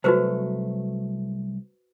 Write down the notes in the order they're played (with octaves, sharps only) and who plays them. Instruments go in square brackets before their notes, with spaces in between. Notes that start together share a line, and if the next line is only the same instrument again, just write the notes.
[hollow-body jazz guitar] C2 F#3 A3 [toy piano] F#4 B4 C5